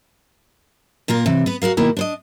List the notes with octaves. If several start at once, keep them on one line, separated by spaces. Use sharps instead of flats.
A#2 A#3 F4 A#4
C3 E3
B3 B4
F#4 A4 A#4 F5
B2 D#3 A#3 E4
D4 C5 D#5